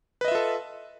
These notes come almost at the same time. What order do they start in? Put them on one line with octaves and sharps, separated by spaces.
B4 D#5 E5 F4 A4